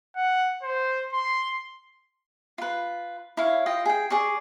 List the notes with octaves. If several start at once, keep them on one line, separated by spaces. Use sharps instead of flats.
F#5
C5
C6
F4 B4
E4 C#5 F5
F4 D#5 G5
G#4 G5
G#4 D5 C#6